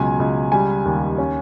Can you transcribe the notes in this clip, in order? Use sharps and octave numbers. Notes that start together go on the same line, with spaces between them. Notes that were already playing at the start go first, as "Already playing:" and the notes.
Already playing: C#2 B2 F#3 G#5
C#2
G3 G#5
D#2
C#4